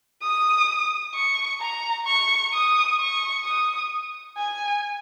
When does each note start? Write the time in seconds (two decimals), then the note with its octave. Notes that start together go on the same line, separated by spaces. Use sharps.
0.22 D#6
1.14 C#6
1.61 A#5
2.06 C#6
2.53 D#6
2.99 C#6
3.45 D#6
4.37 G#5